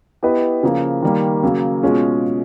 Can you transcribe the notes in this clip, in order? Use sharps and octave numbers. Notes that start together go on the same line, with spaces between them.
B3 E4 G4 B4 D#5
C#3 F3 A#3
D#3 G3 A#3
C#3 F#3 A#3
B2 G#3 C#4 F4 G#4